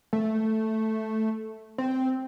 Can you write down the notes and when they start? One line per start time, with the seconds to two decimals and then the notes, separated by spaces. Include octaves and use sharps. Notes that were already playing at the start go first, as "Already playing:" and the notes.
0.13 A3
1.78 C4